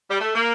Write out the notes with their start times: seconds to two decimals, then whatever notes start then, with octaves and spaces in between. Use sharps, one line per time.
0.10 G3
0.20 A3
0.35 A#3